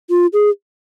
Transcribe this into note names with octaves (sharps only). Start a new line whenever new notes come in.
F4
G#4